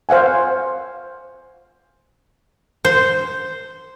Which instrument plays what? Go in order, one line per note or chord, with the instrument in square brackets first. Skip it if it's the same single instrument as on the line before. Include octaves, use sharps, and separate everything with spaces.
[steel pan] C5 F5 F#5 G#5
[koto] C5